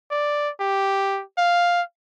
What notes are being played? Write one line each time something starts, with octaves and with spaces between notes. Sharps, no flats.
D5
G4
F5